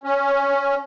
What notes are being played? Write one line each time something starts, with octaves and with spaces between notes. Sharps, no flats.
C#4